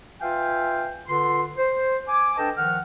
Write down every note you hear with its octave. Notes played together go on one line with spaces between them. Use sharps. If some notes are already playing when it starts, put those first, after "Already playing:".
F4 B4 E5 F5 G5 G#5
D3 F4 B4 C6
C5
G#5 D6
D4 A4 B4 D#5 G5 A5
D#3 F3 F#5 F6